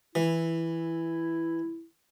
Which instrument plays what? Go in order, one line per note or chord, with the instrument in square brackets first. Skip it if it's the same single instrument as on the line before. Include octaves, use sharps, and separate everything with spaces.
[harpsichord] E3 [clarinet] E4